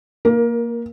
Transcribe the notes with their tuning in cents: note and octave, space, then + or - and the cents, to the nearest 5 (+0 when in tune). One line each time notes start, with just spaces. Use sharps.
A#3 +0 A#4 +20